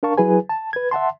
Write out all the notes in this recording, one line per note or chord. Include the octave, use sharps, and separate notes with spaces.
D4 A#4 F5 A5 C#6
F#3 E4 G#4 B4 G#5
A5
B4 G#6
E5 F#5 A5 C6